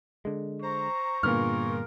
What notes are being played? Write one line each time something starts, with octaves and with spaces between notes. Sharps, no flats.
D3 G#3
C5 A#5 C#6
G2 A#2 D3 B3 F4 G#4 A#4 F6